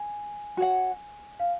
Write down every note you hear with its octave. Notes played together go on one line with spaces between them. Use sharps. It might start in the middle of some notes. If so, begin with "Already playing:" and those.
Already playing: G#5
F#4 C#5 F#5
F5